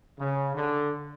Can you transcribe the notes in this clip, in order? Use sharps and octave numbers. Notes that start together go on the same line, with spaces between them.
C#3
D3